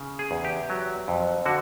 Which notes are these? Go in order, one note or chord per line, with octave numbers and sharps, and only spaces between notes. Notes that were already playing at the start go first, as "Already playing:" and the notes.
Already playing: C#3
G#4
E2
G4
F#3
F2
D3 F#4